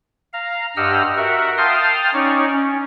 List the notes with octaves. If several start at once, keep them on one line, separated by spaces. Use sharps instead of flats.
F5 A#5
G2 G4 D#5 F#5 E6 F6
F#4 A#4 E5 F#5
F5 G5 A5 C6 D#6 F6
C#4 D#4 C#5 D5
C#4